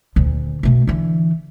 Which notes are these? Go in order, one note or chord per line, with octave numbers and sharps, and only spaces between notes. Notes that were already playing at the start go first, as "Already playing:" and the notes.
D2 A#2
B2 A3
D3 E3